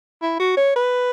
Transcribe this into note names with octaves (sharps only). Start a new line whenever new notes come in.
E4
F#4
C#5
B4